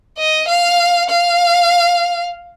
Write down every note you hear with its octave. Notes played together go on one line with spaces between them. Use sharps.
D#5
F5
F5